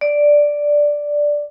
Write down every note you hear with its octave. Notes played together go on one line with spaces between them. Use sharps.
D5